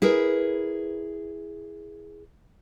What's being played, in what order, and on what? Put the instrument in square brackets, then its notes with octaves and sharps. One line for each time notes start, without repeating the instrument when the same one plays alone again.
[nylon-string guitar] E4 G#4 A#4 B4